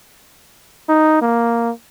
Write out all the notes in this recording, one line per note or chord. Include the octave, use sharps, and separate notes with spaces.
D#4
A#3